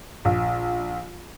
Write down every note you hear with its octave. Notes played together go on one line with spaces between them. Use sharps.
A#1